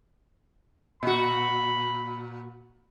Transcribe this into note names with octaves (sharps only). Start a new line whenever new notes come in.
A#2 F#4 B5